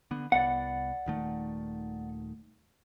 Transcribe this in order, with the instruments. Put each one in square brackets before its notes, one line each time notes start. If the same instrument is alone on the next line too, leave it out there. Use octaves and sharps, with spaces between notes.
[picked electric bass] D3 B3
[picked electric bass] C2 B3 [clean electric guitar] D5 F#5
[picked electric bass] D#1 D#3 A3